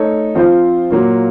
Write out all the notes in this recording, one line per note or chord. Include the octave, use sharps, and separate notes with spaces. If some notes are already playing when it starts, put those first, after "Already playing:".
Already playing: A3 D#4 A4 C#5
F3 C4 F4 C5
A#2 F#3 A#3 F4